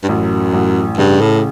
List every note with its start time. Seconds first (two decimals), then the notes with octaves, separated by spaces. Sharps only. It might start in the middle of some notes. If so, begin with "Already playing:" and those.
0.03 G2
0.09 A1 F#2
0.54 A1
0.98 G2 C#3
1.21 A2